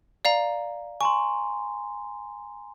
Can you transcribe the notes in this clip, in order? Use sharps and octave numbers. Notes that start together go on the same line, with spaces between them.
D5 F5 A#5
G#5 A#5 C6 C#6